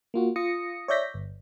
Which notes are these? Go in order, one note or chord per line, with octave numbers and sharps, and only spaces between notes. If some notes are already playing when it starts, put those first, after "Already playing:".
A#3 F4 F#4
F4 D#6 A#6 C#7
C#5 D5 E5 G6 A#6 B6
G1